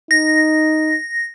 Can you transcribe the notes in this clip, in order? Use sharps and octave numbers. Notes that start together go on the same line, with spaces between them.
D#4 A#6